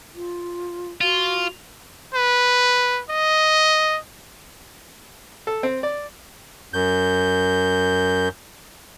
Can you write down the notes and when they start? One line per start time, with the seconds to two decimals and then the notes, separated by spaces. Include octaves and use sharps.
0.15 F4
1.01 F4 F#4
2.14 B4
3.10 D#5
5.47 A4
5.63 C4
5.83 D5
6.74 F#2 G6